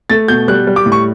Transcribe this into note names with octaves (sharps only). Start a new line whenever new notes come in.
A3 A6
B2 G6
G3 F#6
G3
D6
A2
C#6